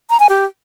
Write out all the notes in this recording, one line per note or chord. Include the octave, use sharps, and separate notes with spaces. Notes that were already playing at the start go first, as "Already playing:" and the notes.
A#5
G#5
G4